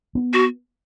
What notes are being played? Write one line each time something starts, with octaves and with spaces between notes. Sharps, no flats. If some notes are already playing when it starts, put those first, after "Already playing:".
B3
F#4